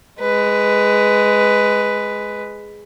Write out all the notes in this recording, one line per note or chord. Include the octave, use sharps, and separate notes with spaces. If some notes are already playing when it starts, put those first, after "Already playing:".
G#3 B4